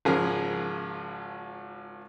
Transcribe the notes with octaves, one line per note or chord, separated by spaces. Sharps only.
G#1 C#3 F3 G#4 A#4